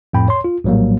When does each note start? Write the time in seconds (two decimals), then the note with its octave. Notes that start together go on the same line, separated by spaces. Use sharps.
0.13 F2 A2 G5 B5
0.28 C#5 C6
0.44 F4
0.64 A#1 A2 F#3 G3 A#3